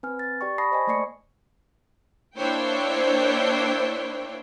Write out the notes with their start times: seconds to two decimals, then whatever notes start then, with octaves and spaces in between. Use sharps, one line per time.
0.03 C4 B4 G#5 F6
0.19 A6
0.41 G4 D5 G5 C#6
0.58 A5 B5 C#6 D#6 A#6 C7
0.72 C5 D#5 G#5
0.87 A3 A#3 D5 C#6 C7 C#7
2.37 A#3 D4 E4 C5 C#5 G5